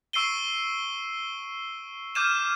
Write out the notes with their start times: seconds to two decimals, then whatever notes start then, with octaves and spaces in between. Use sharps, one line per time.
0.13 C#6 E6 C7 D7 D#7 G7
2.15 D6 F6 G6 G#6 D#7 E7